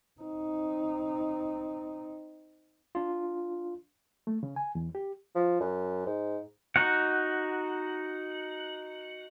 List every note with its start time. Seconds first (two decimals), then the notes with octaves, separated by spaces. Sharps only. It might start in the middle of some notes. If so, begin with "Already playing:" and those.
0.21 C4 D#4
2.95 D4 F4
4.27 A3
4.43 C#3
4.56 G#5
4.75 E2
4.95 G4
5.35 F3
5.60 F#2
6.06 G#2
6.76 D#4 F#4 F#5